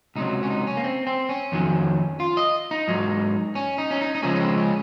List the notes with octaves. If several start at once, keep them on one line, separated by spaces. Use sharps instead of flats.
C#2 C3 F#3 D#4
C#4
D#4
C#4
A#3
C4
C4
C#4
F2 D#3 F#3
F4
D#5
D#4
G#2 F#3
C#4
D#4
C#4
D#4
D#4
C#2 C#3 F3 G#3 C#4
C#4
C4
C#4